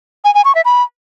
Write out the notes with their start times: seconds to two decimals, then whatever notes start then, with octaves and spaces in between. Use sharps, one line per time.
0.24 G#5
0.34 G#5
0.45 C#6
0.55 E5
0.65 B5